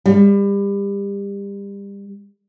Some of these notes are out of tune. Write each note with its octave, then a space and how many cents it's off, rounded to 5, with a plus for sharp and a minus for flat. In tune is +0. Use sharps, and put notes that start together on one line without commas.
G3 +30